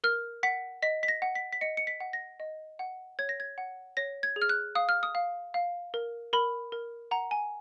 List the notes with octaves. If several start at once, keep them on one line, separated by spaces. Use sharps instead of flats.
A#4 F6
F#5 B6
D#5 B6
B6
A#6
F#5
B6
B6
D#5 C#7
C#7
B6
F#5
A#6
D#5
F#5
C#5 G#6
A#6
G#6
F#5
C#5 A#6
G#6
G#4
F6
F#6
F5 D#6
F6
D#6
F5
F5
A#4
A#4 B5
A#4
F#5 A#5
G#5